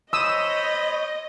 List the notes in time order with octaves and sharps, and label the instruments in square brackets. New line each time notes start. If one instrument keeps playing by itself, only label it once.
[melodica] C5 C#5 B5 [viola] D#5 [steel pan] D#6 E6